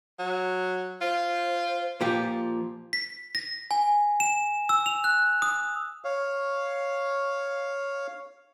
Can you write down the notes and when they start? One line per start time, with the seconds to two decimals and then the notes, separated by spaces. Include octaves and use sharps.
0.19 F#3
1.01 F4 C5
2.01 A#2 F3 G4
2.93 B6
3.35 A#6
3.71 G#5
4.20 E7
4.69 E6
4.86 F7
5.04 F#6
5.42 D#6
6.04 C#5 F5